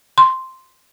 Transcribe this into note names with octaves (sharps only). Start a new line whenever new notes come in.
C6